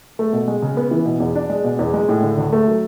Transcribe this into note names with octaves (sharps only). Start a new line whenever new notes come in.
A3
B2
G#3
C#3
B3
E3
B2
E2
D4
G#3
B2
E2
G#3
A2
D3
D2
A3
F#3